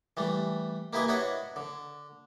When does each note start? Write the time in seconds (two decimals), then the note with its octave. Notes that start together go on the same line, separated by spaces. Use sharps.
0.17 E3 G3 A3
0.93 A#3 E4 G4 B4 D#5 G#5
1.08 D4 E4 F#4 B4 C#5 D#5
1.56 D3